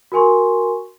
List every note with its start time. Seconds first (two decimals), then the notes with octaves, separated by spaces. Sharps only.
0.12 F#4 A#4 G#5 C6 C#6